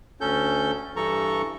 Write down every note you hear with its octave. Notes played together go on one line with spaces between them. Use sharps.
D2 C#4 A4 G6
G2 E3 A4 A#5 C#6